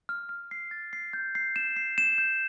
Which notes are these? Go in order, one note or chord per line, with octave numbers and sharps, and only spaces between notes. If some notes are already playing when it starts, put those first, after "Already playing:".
F6
F6
C7
A6
C7
G6
C7
E7
C7
E7
G6